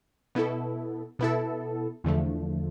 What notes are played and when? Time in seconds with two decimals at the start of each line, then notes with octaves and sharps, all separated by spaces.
0.35 B2 B3 E4 A4
1.19 B2 B3 E4 A4
2.04 E2 D3 F3 A3